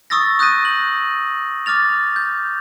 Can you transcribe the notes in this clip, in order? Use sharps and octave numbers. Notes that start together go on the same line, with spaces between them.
C#6 D#6 E6 A6 A#6
D#6 F#6 G6 A#6 D#7
F#7
D6 F6 A6 F7
G6